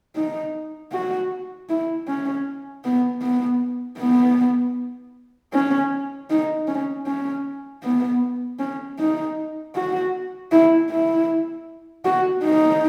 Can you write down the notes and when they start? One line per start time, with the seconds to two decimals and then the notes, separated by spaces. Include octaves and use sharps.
0.16 D#4
0.92 F#4
1.69 E4
2.08 C#4
2.85 B3
3.22 B3
3.99 B3
5.53 C#4
6.30 D#4
6.68 C#4
7.06 C#4
7.83 B3
8.59 C#4
8.99 D#4
9.75 F#4
10.51 E4
10.90 E4
12.05 F#4
12.44 D#4